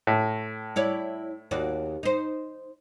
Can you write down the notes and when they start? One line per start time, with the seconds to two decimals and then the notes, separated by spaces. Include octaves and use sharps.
0.07 A2
0.76 E4 C#5 D5
1.51 D#2 F#4 D5
2.03 D#4 C5